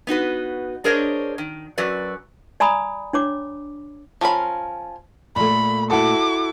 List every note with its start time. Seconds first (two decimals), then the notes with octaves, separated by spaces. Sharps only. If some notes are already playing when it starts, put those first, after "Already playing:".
0.07 B3 D#4 F#4 B4
0.84 D4 G#4 A#4 C5 C#5 D#5
1.38 D#3
1.78 F#2 F#3 F#4 B4 D5
2.60 D5 G#5 A#5 B5 D#6
3.13 D4 C#5 D6
4.21 F3 C#4 A#4 B5
5.36 A#2 A3 B5
5.91 E4 F#4 A4 D6